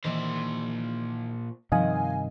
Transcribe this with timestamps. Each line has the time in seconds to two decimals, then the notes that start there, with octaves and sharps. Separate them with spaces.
0.05 A#2 D#3 E3 C5 D5
1.72 G2 C3 D#3 F3 D#5 F5 F#5 G#5